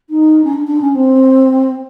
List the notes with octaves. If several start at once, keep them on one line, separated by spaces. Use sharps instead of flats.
D#4
C#4
D4
D4
C#4
C4